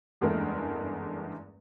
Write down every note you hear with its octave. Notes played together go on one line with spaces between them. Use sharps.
F#1 E2 G2 G#3 A3 A#4